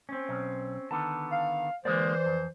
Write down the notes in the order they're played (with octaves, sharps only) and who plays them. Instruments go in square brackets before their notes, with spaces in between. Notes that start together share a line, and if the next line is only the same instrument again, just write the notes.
[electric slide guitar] C4 C#4
[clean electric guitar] B1
[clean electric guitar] D3 D#3 B3 [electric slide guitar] A5
[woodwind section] F5
[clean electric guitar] D3 G#3 A#3 [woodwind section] E3 C5 [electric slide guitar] D5
[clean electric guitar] F2